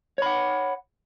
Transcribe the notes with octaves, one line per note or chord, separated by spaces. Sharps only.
C#5 F#5 B5